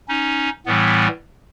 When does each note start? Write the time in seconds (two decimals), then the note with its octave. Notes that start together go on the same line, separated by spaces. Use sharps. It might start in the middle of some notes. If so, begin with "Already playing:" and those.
0.08 C#4 D#4
0.66 A2 E3 G3 B3